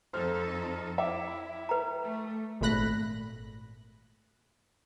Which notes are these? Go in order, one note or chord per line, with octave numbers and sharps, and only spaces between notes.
F2 D#4 A4 C5 F6
E4 E5 G5 D6
B4 G5 A#5
A3
G#1 A#2 A3 B5 F#6 A#6